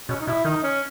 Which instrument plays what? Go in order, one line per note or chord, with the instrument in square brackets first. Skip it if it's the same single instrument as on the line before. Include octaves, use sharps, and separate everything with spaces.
[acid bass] B2 [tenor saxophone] C#4
[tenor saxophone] D#4
[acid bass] B2 [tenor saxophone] E4
[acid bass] D#3 [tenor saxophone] D#4
[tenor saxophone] C#4